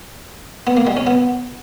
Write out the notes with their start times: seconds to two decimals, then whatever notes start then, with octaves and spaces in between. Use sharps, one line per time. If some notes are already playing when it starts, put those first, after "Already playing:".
0.67 B3
0.77 A#3
0.87 G3
0.97 C#4
1.07 B3